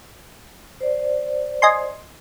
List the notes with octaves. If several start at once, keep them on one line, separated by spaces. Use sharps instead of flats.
C5 D5
D#5 G#5 C6